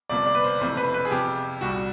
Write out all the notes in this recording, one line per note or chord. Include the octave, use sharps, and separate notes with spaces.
G1 F2 C3 F3 A#3 D5
D5
B4
C5
F#1 F2 C3 E3 A3 C5
B4
B4
G#4
F2 C3 F3 G4
C2 A#2 G3 F#4